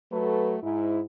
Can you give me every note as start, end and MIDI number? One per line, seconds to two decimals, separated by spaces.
0.12 0.56 54
0.12 0.56 57
0.12 0.56 66
0.12 0.56 69
0.12 0.56 71
0.63 1.02 44
0.63 1.02 64